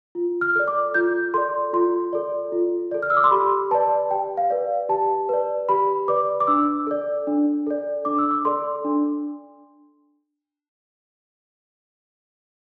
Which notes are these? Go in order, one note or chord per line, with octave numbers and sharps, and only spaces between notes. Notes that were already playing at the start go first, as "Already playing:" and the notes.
F4
F6
A4 D5
D6
F4 G6
A4 D5 C6
F4 C6
A4 D5
F4
A4 D5
F6
E6
D6
C6
G4 B5
B4 D5 A5
G4 G5
F5
B4 D5
G4 A5
B4 D5
G4 B5
B4 D5 D6
D6
D4 E6
A4 D5
D4
A4 D5
D4 D6
E6
D6
A4 D5 C6
D4